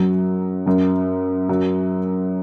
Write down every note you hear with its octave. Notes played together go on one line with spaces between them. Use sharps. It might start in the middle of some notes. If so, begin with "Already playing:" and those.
Already playing: F#2 F#3
F#2 F#3
F#2 F#3